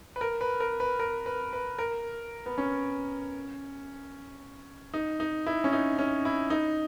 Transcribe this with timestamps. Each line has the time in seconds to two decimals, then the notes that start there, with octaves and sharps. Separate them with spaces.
0.16 B4
0.21 A#4
0.41 B4
0.60 A#4
0.80 B4
0.99 A#4
1.26 B4
1.53 B4
1.79 A#4
2.46 B3
2.58 C#4
4.94 D#4
5.20 D#4
5.47 E4
5.64 C#4
5.72 D#4
5.99 C#4
6.25 E4
6.50 D#4